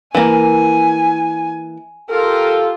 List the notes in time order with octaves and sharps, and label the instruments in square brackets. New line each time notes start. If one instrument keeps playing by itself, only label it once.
[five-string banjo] E3 A#3 [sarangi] G#5
[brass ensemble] F4 G4 A4 [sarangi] A#4